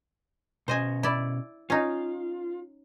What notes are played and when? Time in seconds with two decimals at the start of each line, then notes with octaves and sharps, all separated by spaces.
0.68 B2 C#4 C5 D#5 G#5
1.03 E4 D5
1.70 C#4 D#4 F4